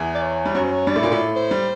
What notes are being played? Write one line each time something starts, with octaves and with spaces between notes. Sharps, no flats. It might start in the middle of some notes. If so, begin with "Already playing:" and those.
Already playing: E2 E3
D5
C#5
G3
F#2 F#3 C#5
C5
C#5
G2 G3 D5
A2 A3
A#2 A#3
A2 A3
C5
G3